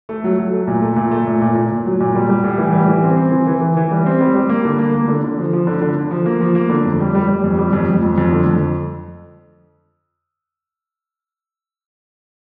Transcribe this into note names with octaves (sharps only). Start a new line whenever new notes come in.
A3
F#3
F#3
A3
A#2
A3
A#2
A3
A#2
A#2
A#2
A#2
F#3
A#2
G3
G3
A2
E3
G3
E3
C4
C4
E3
E3
E3
E3
G3
C4
G3
G3
A#3
D3
A#3
A#3
D3
D3
F3
F3
D3
D3
D3
F3
A#3
F3
A#3
D3
F2
G3
G3
G3
F2
G3
F2
F2
F2
F2
D3
F2